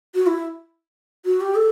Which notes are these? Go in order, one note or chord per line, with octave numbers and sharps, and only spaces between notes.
F#4
E4
F#4
G4
A4